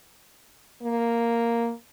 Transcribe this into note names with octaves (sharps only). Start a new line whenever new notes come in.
A#3